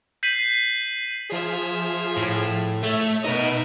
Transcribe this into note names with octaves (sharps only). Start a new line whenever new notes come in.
G6 B6 C7 D#7 F#7
F3 F4 G#4 E5
A2
A3 C#5 E5
B2 D#4 A#4 B4 D#5 E5